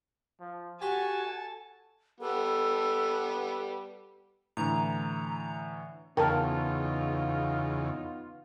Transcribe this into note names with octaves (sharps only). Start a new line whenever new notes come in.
F3
F#4 G4 A4 G#5 A5 B5
G3 B3 A4
A2 D3 E3 A#5
E2 C#3 B3 D#4 F4 A#4 G5 A5